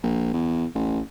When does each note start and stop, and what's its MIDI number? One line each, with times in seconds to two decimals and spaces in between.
0.03 0.32 34
0.34 0.65 40
0.75 1.00 33